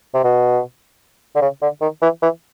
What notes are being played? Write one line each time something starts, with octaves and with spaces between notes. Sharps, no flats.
C3
B2
D3
C#3
D3
D#3
E3
E3